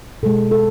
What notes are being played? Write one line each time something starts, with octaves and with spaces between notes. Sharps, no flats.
B2 G#3 A4
A4